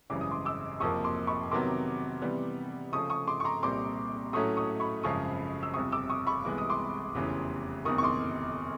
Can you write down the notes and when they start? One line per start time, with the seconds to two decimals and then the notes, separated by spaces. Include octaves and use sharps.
0.10 G#1 F#2 C#3 E3 G3 D6
0.21 D#6
0.31 C6 D6
0.45 D6 E6
0.80 F#1 F2 C3 F3 A#3 C#6 D#6
1.04 C6 D6
1.27 B5 C#6
1.51 C3 D#3 F#3 B3 C6 D6
2.22 C3 E3 G3 B3
2.93 C#3 F3 A3 C#6 D#6
3.10 C#6 D#6
3.28 C6 D6
3.40 C#6
3.45 A#5 C6
3.63 C2 A#2 G3 C4 C6 D6
4.33 A2 F#3 A3 C#4 C#6 D#6
4.57 C#6 D#6
4.80 B5 C#6
5.03 G#1 F#2 C#3 F3 C#6 D#6
5.63 E6
5.74 G1 F2 C3 C#6 D#6
5.92 D6 E6
6.10 C#6 D#6
6.27 B5 C#6
6.45 C2 C3 E3 G#3 B3 D6
6.58 D#6
6.70 C6 D6
7.15 F1 E2 C#3 E3
7.85 F#1 E2 C3 D#3 C#6 D#6
7.98 C#6
8.03 C6 D6